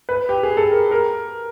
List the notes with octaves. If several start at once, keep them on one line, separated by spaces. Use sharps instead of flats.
B4
G4
G#4
A4
A#4
A#4